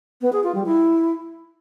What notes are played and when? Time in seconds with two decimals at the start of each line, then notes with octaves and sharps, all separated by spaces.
0.21 B3
0.32 G#4
0.43 F4
0.54 G3
0.65 E4